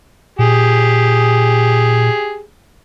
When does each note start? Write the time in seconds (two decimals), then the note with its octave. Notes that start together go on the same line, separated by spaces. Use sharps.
0.39 A#2 G4 G#4